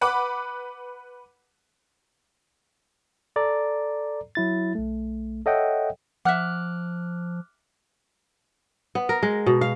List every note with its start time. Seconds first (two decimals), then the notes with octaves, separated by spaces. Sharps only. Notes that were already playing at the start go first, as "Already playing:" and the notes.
0.01 B4 F#5 B5 D6
3.36 A4 D5 A#5
4.35 F#3 E4 A6
4.75 B1 A3
5.46 A4 C#5 D#5 E5 F#5 G5
6.25 F3 E5 F#5 D6 F6 F#6
8.95 B3
9.09 A#4
9.23 G#3
9.46 B2
9.61 F5